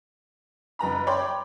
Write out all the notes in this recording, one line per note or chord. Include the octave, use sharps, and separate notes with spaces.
F#1 B4 A#5 B5
C#5 D5 G5 B5 C6